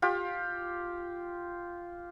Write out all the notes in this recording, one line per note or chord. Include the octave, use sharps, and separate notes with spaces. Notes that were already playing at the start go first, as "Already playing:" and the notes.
F4 G4